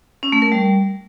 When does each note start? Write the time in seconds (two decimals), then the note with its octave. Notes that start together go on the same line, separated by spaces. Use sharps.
0.23 C#4
0.32 A3
0.42 A#4
0.52 G3